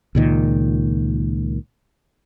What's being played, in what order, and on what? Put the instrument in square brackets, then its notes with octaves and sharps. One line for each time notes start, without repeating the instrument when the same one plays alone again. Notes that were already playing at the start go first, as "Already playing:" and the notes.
[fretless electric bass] C#2 A#2 D#3